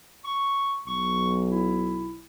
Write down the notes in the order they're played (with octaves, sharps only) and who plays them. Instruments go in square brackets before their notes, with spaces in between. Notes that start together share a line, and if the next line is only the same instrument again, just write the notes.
[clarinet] C#6
[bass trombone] B1 [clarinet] C#6
[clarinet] E4